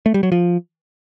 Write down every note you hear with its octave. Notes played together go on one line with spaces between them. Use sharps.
A3
G3
F#3
F3